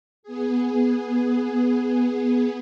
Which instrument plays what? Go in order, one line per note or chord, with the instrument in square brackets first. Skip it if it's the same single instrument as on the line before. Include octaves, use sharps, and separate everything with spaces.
[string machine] B3 G#4